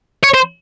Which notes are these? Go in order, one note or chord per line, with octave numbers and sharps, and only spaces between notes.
C#5
C5